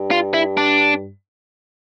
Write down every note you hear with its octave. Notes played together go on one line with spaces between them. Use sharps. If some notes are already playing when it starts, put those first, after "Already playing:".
Already playing: G2
F4
E4
D4